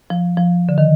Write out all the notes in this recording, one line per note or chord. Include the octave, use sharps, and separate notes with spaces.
F3
F3
D3
D#3